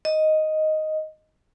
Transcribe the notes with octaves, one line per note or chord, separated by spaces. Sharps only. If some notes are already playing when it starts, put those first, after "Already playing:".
D#5